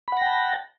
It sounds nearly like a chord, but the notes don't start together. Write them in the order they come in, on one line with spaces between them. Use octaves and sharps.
B5 F#5 A#6 G5 A5